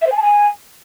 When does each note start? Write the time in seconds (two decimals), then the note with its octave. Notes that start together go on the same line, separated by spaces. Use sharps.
0.01 E5
0.06 C5
0.11 G#5
0.16 A5
0.21 G#5